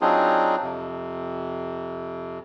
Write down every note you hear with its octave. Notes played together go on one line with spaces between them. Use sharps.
F#3 C4 D4 D#4 F4 G#4
F2 C3